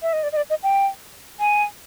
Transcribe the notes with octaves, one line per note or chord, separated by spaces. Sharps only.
E5
D#5
D5
D#5
D5
D#5
G5
G#5